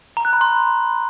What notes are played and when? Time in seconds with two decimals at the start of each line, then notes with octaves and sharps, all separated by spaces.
0.17 A#5
0.25 F#6
0.33 B5
0.41 C6